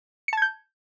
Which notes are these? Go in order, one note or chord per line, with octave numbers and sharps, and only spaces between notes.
A5 G6 G#6 C#7